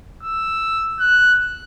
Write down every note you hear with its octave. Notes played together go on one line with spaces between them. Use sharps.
E6
F#6